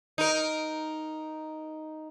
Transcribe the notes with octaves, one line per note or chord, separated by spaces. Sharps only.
D#4 A#4